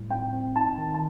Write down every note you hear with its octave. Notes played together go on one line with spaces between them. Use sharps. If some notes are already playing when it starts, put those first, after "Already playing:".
Already playing: A2 G3
C4 G5
C4
D#4 A5
D#3
A5